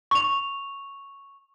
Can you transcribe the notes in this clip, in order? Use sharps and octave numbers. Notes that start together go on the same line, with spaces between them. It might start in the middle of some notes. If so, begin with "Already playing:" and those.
C#6 F7